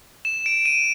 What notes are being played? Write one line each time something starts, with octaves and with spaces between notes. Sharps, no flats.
E7
D7
D#7